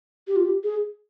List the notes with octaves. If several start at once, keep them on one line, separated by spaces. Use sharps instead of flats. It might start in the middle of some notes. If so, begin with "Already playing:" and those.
G4
F4
G4
G#4